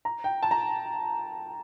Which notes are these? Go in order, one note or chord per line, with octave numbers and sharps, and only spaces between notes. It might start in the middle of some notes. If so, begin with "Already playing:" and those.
A#5
G5
A5
A#5